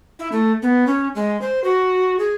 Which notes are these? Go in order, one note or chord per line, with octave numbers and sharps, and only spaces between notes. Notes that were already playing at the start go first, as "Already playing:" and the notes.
E4
A3
B3
C#4
G#3
C5
F#4
G#4